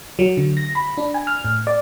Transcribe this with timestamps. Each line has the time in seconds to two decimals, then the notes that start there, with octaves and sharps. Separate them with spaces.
0.19 F#3
0.37 D3
0.57 A#6
0.75 B5
0.98 D4
1.14 G#5
1.27 F6
1.44 A2
1.67 D5